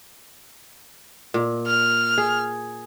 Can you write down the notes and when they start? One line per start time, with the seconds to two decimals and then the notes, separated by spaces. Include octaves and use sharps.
1.34 A#2
1.67 F6
2.18 G#4